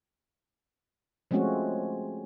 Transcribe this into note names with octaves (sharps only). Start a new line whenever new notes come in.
F3 G#3 A3 C4 C#4 F#4